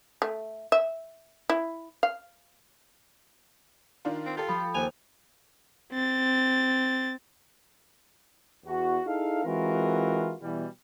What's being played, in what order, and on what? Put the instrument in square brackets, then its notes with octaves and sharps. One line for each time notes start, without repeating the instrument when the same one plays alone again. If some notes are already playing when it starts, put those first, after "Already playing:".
[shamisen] A3
E5
E4
F5
[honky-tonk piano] D#3 D4 F4
[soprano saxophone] C4
[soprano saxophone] F4 [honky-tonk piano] G4 A4
[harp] F3 [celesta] B5
[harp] D#2 [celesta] A#4 C5 F7 [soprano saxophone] G#5
[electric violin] C4 A6
[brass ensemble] E2 F#4
D#4 E4 G#4 A4 F5
E3 G#3 C4 F4 F#4 A#4
B2 E3 G3